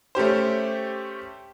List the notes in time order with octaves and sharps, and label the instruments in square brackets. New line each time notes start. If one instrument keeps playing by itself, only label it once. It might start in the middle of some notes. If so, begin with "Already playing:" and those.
[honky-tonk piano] A3 C#4 G4 C5